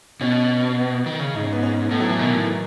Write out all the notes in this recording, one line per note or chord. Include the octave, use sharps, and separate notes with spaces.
B2 C#4
D#3
C#3
G#2 D#4
C#4
B3
C#4
A2 B3
F#3
E3
B2 D#3
A2